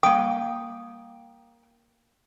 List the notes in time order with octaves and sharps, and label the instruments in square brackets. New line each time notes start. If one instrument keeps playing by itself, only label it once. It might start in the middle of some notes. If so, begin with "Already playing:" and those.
[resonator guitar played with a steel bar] A#3 G5 [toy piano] D#6